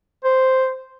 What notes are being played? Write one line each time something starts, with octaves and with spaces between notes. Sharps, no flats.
C5